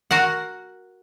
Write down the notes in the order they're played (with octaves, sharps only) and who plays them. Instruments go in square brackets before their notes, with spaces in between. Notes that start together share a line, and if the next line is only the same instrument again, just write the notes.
[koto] F#4 A#4 F#5